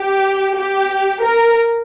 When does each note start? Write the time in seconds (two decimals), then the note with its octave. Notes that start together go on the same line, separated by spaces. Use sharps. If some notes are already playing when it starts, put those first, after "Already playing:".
Already playing: G4
0.57 G4
1.23 A#4